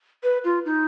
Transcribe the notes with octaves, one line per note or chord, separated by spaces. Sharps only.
B4
F4
D#4